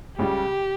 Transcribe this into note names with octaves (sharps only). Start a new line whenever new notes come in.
C#2 C#3 G3 G4